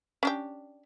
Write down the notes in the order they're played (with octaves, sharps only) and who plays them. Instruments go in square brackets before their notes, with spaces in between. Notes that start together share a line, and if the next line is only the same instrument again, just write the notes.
[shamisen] C#4 D4 G4